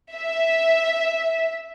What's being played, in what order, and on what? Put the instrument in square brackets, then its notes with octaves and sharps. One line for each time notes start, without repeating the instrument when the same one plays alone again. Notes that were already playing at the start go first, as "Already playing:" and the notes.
[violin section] E5